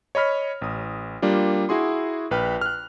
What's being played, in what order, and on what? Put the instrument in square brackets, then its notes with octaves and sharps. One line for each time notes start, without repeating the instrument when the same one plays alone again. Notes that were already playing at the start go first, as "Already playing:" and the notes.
[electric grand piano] C#5 D#5 B5 F6 B6
A1 D#6
G3 A#3 D4 F4
E4 F#4 G#4 C6
A#1 B4 G5 F6
F6 F#6